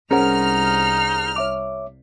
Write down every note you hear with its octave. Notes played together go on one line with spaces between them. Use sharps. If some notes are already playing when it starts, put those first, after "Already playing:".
C2 C#4 D#4 G#4 A#4 C5 F#5 F6
C#5 E5 D6